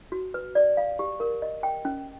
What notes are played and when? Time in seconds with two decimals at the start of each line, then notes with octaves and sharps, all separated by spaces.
0.12 F#4
0.34 B4
0.55 D5
0.77 F5
0.99 G4
1.20 A#4
1.42 D#5
1.63 G5
1.85 C#4